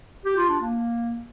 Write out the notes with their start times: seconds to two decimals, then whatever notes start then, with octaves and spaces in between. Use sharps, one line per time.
0.25 G4
0.37 F4
0.49 D4
0.61 A#3